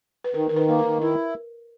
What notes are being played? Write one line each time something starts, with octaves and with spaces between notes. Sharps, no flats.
B4
D#3 A#4
D#3 A#4
B4
A#3 B4
A#4
D#3
E4 A#4